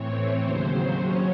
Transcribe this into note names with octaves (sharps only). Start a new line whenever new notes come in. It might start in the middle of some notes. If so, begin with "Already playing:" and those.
Already playing: A2 E3 C4 C#5
D#2 C#3 F#3 C5
C3 F#3 C#4 C#5